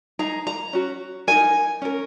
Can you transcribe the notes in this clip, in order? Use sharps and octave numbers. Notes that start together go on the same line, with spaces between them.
D#4 G#4 A#5
A#5
C#4 F#4
D#4 F#4 A#4 G#5
C#4 A#4